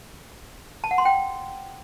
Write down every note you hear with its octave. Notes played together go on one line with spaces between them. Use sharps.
A5
F#5
C6
G5